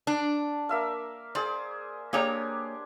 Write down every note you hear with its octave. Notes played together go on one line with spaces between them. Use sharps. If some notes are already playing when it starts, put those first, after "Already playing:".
D4 A5
A#3 E5 F5
G#4 C5 D5
A#3 D4 G4 G#4 C#5 A#5